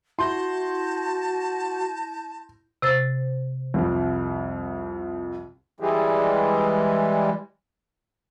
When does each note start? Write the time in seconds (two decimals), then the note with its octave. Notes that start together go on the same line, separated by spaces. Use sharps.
0.19 E4 F#4 A5 C6 G6 A#6
2.82 C3 C5 A6
3.74 C2 F2
5.80 E3 G3 G#3